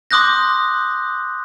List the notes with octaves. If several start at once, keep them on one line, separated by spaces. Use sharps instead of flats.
C6 D6 D#6 F#6 G6 A#6